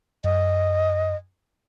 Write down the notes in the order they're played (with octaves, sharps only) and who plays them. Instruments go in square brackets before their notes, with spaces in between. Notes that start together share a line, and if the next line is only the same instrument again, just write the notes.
[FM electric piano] F#2 [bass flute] D#5